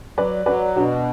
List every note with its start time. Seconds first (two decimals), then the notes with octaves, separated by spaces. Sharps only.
0.17 F#3 B4 D5
0.46 F#3 B4 D5
0.76 B2 D4 F#4